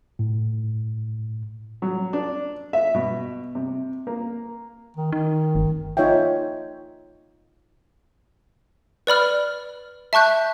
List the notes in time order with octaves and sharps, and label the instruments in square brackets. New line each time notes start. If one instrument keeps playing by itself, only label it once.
[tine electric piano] A2
[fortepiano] F#3
D4
E5
B2
C3
A#3
[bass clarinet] D#3
[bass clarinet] D#3 [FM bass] D#4
[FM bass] G1
[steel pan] D#4 F4 C#5 D#5 E5 G5
[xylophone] B4 D5 B5 F6
E5 A5 C#6 F#6 G6